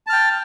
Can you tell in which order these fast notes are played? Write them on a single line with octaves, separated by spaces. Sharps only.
A5 F6 G5